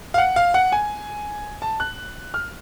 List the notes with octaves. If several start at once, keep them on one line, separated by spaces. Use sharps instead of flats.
F5
F#5
F5
F#5
G#5
A5
F#6
F6